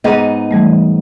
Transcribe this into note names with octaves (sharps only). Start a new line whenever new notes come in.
G#2 B3 D#4
E3 G3 A3